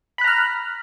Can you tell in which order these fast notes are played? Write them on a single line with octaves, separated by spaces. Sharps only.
B5 F#6 A#5 F6